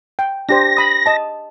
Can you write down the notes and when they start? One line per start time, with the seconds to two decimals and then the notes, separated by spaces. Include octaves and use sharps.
0.19 G5
0.49 D4 G4 C5 A#6
0.77 B5 D#6
1.06 D#5 A5